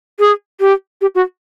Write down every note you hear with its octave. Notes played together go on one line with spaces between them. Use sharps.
G#4
G4
G4
F#4